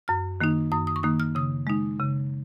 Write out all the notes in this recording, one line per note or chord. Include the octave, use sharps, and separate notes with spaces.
F#2 F6
D#3 A#3 D#4
F#2 D#6
D#6
C#6
D#3 A#3 D#4 D#6
F6
C#3 D#6
G#3 D#4
C#3